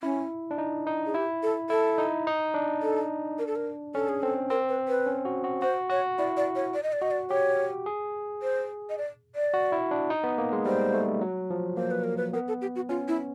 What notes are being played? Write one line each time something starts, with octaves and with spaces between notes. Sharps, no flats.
C#4 E4
D4
D#4
D#4
G#4
E4 G4
A4
E4 A4
D#4
D#4
D4
A4
A#4
A4
A#4
C#4 A4
G#4
C4 A4
C4 A#4
B4
B4
C#4
F#4
F#4
F#4 C5
F#4 C#5
E4 D5
D5
C#5
D5
D#5
D5
F#4 D#5
D5
G4 C#5
G#4
C5
D#5
D5
D5
F#4
E4
D4
D#4
B3
A#3
G#3
G3 C5
A3
F#3
F3
A#3 C5
B4
A#4
B4
B3 A#4
A4
G4
F#4
C#4 F4
E4